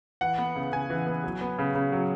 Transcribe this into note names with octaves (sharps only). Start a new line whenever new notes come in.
E3 F#5
B3
C#3
C#3 G#5
E3
B3
F#3
B3
C#3
C#3
F#3